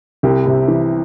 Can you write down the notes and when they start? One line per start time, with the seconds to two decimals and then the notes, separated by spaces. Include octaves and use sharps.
0.23 C2 G4
0.46 C3
0.68 E3